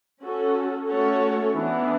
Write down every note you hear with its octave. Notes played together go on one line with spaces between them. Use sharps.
C#4 F#4 A4
A3 C#4 F#4 A4 C#5
E3 B3 D4